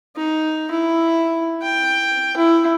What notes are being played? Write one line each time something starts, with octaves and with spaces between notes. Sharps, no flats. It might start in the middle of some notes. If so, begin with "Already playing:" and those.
D#4
E4
G5
E4